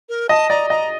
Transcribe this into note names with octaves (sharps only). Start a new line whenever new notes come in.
A#4
D#5 A5
D5 A#5
D#5 A#5